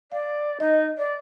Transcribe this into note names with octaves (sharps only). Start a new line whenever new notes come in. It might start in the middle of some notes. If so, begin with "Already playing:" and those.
D5 F5
D#4 D#5
D5